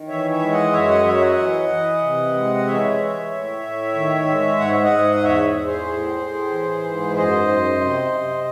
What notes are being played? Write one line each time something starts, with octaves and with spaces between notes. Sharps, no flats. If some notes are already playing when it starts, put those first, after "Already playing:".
Already playing: D#3
E3 C#5 E5
C#5 E5
G#3
D#5 F#5
F#2 C#5 E5
D#5 F#5
F#3 C#5 E5
D#5 F#5
E3
E3
C3
G#3
D#5
E3 C#5 E5
E3
A2
A2
D#3
G#3
G#2 F#5
E5
D#5 F#5
G#2
D#5
E2 C#5 E5
E2
G#4 C5
A2
A2
E3
G#2
F#2 C5 D#5
F#2
C3
C3